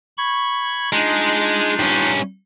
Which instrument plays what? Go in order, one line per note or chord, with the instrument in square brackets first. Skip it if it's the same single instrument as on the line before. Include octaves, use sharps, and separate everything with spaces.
[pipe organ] B5 C#6 G#6
[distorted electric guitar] G#3 [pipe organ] D4 D#4 F4
[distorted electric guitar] G2 C#4